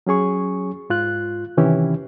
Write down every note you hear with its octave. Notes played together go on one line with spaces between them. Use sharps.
F#3 C#4 G#4 C#6
G#2 F4 F#6
C3 D#3 E3 C#4 E4 G4